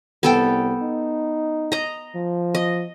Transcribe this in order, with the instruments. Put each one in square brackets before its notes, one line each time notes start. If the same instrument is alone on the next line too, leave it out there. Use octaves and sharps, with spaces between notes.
[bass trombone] C2 [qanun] B3 A4 G5
[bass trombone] D#4
[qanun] D#5 A#5
[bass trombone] F3
[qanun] D#5